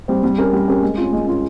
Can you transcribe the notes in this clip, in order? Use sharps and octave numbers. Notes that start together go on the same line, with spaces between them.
G3 C4
G3
C#4 G4 A#4
G3
C#4 G4 A#4
G#3
C#4 F4
G#3
C#4 F4